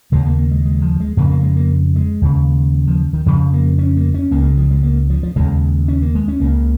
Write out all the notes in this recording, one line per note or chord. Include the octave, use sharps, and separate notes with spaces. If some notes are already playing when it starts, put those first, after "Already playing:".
D#2 C#3 G#3
A#3
A#3
G#3
G#3
F3
G#3
F2 C#3 A#3
A#3
G#3
A#3
G#3
D#2 C#3
F3
D#3
F2 C#3 F3
A#3
C#4
A#3
C#4
C#2 C#3 A#3
G#3
F3
G#3
A#3
F3
F3
D#2 C#3 G#3
C#4
A#3
G#3
C#4
C#2 C#3 A#3